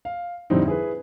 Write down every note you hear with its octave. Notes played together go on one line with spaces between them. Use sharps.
F5
F2 A2 D3 G3 C4 D#4
E4 G#4 B4